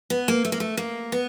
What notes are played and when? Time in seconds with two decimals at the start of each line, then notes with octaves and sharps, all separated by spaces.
0.10 B3
0.28 A#3
0.45 A3
0.52 A#3
0.60 A3
0.77 A#3
1.12 B3